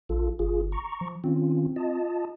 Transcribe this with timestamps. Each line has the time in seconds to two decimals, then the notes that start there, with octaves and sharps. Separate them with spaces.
0.09 A#1 F4 A4
0.39 G1 F4 G#4
0.72 A#5 C#6
1.01 F3
1.24 D#3 C4 C#4 F4
1.76 F4 D#5 A5